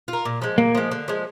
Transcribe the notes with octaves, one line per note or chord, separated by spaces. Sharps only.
F4
A#4
A#2
F3 G#3
A#2 A#3
F3 G#3
D3
F3 G#3